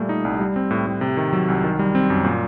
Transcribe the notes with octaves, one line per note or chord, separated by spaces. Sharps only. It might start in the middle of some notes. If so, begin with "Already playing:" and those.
Already playing: A#2 G3 A3
D#4
C2
G3
C4
A2
A2
C3
D#3
F#3
C2
D#3
G3
C4
F#2
A#2